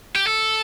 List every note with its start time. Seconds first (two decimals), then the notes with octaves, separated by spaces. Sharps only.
0.16 G4
0.27 A4